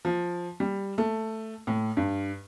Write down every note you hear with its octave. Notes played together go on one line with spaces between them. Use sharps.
F3
G3
A3
A2
G2